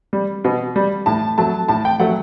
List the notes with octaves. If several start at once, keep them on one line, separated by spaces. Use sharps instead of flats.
G3
B2
G3
A2 A5
F#3 A3 A5
A2 A5
G5
F#3 A3 F#5